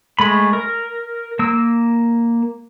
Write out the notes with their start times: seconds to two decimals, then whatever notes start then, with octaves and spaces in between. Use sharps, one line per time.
0.19 G#3 A3 B5
0.53 A#4
1.39 A#3 E6